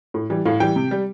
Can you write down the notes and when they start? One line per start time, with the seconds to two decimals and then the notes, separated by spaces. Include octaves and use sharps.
0.14 A2
0.30 E3 G3
0.45 A2 F5
0.60 E3 G3 G5
0.76 C3
0.91 G3